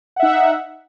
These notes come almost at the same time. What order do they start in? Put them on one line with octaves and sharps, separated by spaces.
F#5 E5 D#4